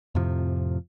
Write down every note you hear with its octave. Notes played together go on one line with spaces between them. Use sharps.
F2 A2 C3 F3